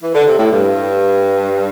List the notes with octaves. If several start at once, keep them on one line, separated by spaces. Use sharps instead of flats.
E3
D3
C3
A2
G2